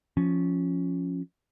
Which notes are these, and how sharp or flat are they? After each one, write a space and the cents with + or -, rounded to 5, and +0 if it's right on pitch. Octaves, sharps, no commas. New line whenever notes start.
F3 +0 C#4 +0